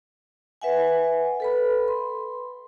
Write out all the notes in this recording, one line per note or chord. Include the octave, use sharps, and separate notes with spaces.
B4 E5 F#5 G#5
A4 B4 B5
C6